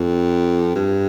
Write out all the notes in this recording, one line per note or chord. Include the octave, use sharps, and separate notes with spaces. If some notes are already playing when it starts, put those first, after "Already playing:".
Already playing: F2
G2